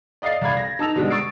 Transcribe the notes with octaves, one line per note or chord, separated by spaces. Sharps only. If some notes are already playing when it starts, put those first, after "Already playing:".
D5 D#5 F5 A6 C7
C2 D5 F5 B5 G#6
A#6
D#4 A5 E6 F7
B2 D3 G3 G#3
C#6 D#6 E6 A6 C7 D7